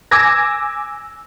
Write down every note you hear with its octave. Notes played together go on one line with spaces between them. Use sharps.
G#5 D6 E6 G#6 A#6